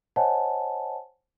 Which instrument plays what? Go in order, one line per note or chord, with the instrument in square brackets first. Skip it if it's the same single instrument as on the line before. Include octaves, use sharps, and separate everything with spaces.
[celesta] C5 C#5 D#5 F#5 G#5 A5